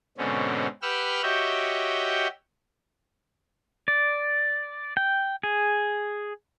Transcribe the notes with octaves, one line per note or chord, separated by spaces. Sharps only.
G#2 B2 D3 C4 C#4
G4 B4 F#5 G5 E6 F6
F#4 G4 C#5 D#5 E5 G5
D5
G5
G#4